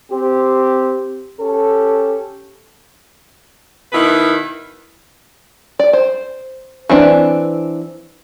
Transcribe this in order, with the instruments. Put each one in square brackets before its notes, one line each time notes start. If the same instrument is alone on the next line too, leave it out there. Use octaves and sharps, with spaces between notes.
[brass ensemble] C4 G4
C#4 G4 A4
[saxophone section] B2 D#3 E4 B4
[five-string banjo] D5
C5
E3 C4 D4 B4